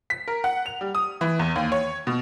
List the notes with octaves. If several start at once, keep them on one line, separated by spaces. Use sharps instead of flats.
B6
A#4
F#5
F7
G3
D#6
E3
E2
D#2
C#5
B2